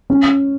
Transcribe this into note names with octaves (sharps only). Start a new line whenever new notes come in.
C#4